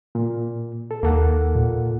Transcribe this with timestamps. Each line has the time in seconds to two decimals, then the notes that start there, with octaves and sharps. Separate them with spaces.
0.15 A#2
0.91 A4
1.03 D#2 A#3 A4 F#5
1.55 A#2